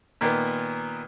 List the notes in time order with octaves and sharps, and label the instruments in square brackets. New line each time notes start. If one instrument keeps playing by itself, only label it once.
[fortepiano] A#2 D#3 A#3 B3